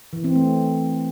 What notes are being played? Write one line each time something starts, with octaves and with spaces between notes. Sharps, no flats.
E3
C4
A3